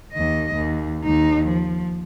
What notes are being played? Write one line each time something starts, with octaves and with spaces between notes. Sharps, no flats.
D#2 D#5
D#2
D#2 D#4
F3